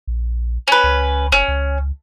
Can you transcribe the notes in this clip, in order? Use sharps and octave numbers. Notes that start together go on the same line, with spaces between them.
A#1
C#4 B4
C#2
F#1 C#4
C#2